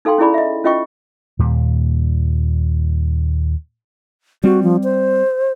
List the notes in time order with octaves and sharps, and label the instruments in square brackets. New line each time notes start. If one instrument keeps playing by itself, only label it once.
[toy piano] D#4 A4 F5 G5 C6
C#4 E4 G#4 D5 B5
D#5 E5
C#4 F4 D#5 G5 C#6
[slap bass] D#2 A#2 G3
[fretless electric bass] G3 C4 [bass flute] F#4
[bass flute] F3
C5